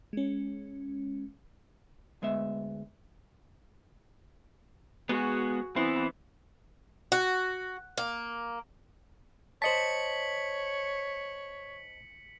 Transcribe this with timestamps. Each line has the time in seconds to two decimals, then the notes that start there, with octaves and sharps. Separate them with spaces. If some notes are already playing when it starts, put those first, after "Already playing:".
0.13 G#3 C#4
2.22 D2 G#3 B3 E5
5.09 G#3 B3 F#4 G#4
5.76 E3 B3 C4 E4
7.12 F#4
7.98 A#3
9.62 C5 C#5 D#5 A5 B6 C#7 F#7